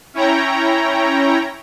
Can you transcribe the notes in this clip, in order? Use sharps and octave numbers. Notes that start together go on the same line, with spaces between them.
C#4 E4 C#5 G5 A#5